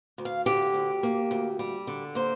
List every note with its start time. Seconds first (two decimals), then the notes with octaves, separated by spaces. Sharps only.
0.18 D2
0.25 F5
0.46 D3 G4
0.74 D2
1.03 A#3
1.31 D2
1.59 G3
1.87 D3
2.15 A#3 C5